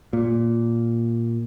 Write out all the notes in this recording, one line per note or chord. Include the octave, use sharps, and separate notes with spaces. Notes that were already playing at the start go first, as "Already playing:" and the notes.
A#2